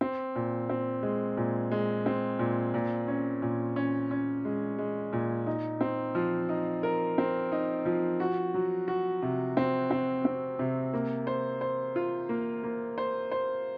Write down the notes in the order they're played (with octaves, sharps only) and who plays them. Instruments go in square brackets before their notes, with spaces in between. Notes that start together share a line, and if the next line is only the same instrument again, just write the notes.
[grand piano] C4
A#2
C4
G#3
A#2
G#3
C4
A#2
A#2
C#4
A#2
C#4
C#4
G#3
G#3
A#2
D#4
C4
F3
D#4
A#4
C4
D#4
F3
F#4
F#3
F#4
C3
C4
C4
C4
C3
A#3
C5
C5
F4
A#3
A#3
C5
C5